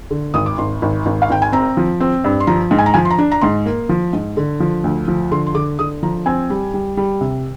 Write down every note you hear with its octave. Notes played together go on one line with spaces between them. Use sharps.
D3
G#1 D#6
D6
G#1 C6
G#1
G#1
F5
G#1 G5
G#5
C4 A#5
F3
C4
G2
C6
F3 A#5
G#2
G#5
A#5
F3 G#5
C6
A#5
D4
A#5
G#2 C6
A#3
F3
G#2
D3
F3
D2
F3
D3 C6
C6
D3 D6
D3 D#6
F3 A#5
C4 G#5
G3
G3
G3
C3